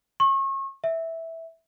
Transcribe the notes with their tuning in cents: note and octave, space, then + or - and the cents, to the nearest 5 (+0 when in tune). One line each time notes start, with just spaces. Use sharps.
C#6 -35
E5 -10